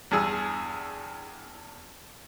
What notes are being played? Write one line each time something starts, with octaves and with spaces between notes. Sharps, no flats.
E2 G2 G#4 E6